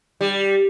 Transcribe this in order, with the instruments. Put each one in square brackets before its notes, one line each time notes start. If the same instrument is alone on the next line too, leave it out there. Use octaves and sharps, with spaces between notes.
[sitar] G3